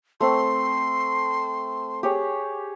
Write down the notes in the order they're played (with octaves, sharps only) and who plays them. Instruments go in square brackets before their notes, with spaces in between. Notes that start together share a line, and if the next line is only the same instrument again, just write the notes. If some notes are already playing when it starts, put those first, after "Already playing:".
[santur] A3 C4 [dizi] C6
[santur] G4 G#4 C#5